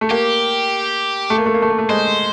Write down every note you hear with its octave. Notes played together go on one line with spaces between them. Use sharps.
A3
A#3 G4
A3
A#3
A3
A#3
A3
A#3
A3
G#3 C5